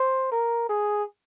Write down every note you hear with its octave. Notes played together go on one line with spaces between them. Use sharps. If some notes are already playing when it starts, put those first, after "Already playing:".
Already playing: C5
A#4
G#4